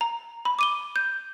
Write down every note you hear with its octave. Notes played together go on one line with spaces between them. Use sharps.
A#5
B5
D6 D#7 G7
G6